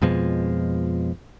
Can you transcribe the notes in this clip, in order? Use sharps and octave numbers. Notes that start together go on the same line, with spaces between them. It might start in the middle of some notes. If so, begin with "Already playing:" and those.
F2 B2 F3 G#3